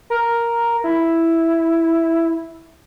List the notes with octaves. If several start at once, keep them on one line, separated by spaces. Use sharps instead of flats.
A#4
E4